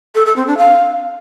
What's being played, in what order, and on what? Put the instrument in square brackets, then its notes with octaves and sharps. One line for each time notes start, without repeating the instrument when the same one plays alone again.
[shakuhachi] A4
A4
C4
D4
F5